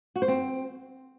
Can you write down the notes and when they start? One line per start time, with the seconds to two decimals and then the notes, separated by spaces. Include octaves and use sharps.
0.16 F#4
0.22 C5
0.28 C4